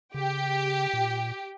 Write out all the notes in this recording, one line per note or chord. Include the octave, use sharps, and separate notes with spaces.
C#3 G4
A#2